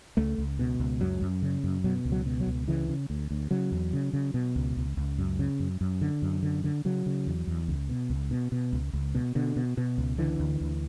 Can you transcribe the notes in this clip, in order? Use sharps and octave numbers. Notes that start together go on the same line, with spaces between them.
C#2 A3
C#2
B2
C#2
F#2 F#3
F#2
C#3
F#2
B2 F#3
C#2
F#3
B2
F#3
C#2
C#3 E3
C#3
D2
D2
C#3 F#3
E2
C#3
C#3
B2
C#2
C#2
C#2
F#2
C#3
F#2
F#2
D3
F#2
D3
D3
C#3 F#3
C#3
E2
E2
C#2
B2
C#2
B2
B2
C#2
C#2
B2
B2 D3
B2
B2
C#2
D3 E3
D2
D2